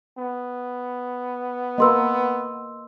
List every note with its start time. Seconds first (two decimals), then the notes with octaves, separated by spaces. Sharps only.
0.18 B3
1.78 A#3 A#4 B4 D#5 C6 E6